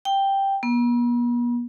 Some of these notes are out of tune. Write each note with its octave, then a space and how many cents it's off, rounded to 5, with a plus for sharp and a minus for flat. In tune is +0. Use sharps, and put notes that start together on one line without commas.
G5 +0
B3 -45